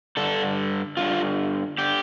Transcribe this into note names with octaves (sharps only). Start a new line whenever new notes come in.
G2 D3 A4
G2 D3 F4
D3 G4